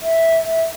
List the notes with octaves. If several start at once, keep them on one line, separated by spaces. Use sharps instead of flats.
E5